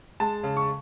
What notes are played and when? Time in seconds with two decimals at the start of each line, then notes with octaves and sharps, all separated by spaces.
0.20 G#3 A5
0.43 C#3
0.57 C#6